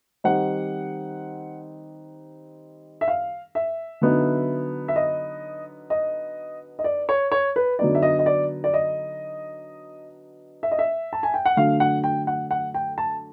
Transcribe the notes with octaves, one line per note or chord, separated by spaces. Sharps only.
D#3 G3 C4 D#4 F#5
E5
F5
E5
D3 F#3 B3 D#4
E5
D#5
D#5
D#5
D5
C#5
C#5
B4
D3 F#3 B3 D#4 D5
E5
D#5
D#5
D5
D5
D#5
E5
D#5
E5
A5
G#5
G5
F#5
D3 F#3 A3 D4 F5
F#5
G5
F#5
F#5
G5
A5